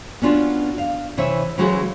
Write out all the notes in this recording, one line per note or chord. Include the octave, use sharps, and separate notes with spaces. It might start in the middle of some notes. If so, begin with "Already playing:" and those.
B3 C#4 D4 F4 F#4
F5
C3 E3 C#5 E5
C#3 E3 F#3 G#3 F#4 A4